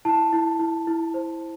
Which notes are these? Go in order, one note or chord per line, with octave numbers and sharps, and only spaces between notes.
E4 A5
E4
E4
E4
C5